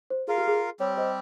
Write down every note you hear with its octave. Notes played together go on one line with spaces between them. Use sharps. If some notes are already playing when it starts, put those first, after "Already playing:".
C5
F4 G#4 A#4 F5
G4
G#4
G3 C4 G4 C#5
C5 D#5